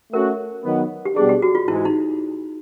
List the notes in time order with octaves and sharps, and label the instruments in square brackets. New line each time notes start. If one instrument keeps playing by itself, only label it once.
[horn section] A3 C#4 F#4 [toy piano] A#4
[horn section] D#3 F#3 B3
[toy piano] G4
[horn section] B2 G3 B3 D4 [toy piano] G#4
[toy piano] G4
F#4
F4
[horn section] G#2 E3 G#3 [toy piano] E4
[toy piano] D#4